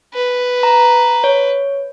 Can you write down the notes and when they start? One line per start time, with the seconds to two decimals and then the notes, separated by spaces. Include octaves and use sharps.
0.14 B4
0.63 A#5
1.24 C#5